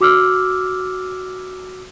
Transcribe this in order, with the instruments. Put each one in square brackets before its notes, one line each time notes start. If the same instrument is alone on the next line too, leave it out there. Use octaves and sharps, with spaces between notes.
[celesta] F#4 D6 E6 F6